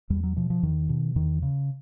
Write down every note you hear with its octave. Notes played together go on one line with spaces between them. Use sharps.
E2 G3
F#3
B2 F3
F3
E2 D#3
B2
E2 D#3
C#3